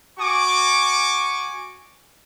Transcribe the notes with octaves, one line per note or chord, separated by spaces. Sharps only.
F#4 G#5 C#6 D6